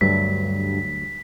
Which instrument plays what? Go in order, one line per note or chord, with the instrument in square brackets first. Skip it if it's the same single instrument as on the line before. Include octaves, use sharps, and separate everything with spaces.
[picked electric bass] D2 F#3 A3 [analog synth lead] G2 [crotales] B6